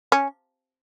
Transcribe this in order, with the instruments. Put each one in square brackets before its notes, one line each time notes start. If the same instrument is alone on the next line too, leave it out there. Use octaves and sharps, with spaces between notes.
[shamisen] C#4